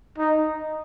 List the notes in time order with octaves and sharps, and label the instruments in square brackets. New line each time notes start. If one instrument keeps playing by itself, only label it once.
[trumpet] D#4